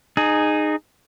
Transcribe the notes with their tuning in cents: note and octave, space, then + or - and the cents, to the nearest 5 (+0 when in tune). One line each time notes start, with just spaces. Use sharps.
D#4 -20 G#4 +0